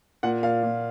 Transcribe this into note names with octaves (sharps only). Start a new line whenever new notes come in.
A#2 F#5
A#2 F5
A#2